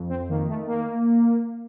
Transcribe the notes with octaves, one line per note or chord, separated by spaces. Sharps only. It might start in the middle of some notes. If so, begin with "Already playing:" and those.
Already playing: F2
C4
D#3 A#3
A3
A#3